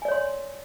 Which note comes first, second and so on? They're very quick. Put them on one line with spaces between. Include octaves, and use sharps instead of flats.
G#5 D5 C#5 C6